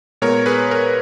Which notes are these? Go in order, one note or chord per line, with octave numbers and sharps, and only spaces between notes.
A#2 G#3 B3 A#4 C#5
G#4 B4
A#4